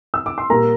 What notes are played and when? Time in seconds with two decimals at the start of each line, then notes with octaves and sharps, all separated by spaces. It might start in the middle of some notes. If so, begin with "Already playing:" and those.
0.14 E6
0.26 D6
0.38 C6
0.50 A#2 G3 A#3 A#4 A#5